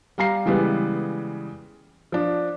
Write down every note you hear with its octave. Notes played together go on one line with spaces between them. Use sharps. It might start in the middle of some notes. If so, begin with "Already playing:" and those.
G3 F5 A#5 C7
C#3 E3 G3 G#3 B3
F3 D4